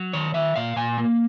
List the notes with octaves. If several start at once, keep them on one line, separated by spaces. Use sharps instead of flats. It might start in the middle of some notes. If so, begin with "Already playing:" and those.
Already playing: F#3
D#3 C#5
D#3 E5
A#2 F5
A#2 G#5
A#3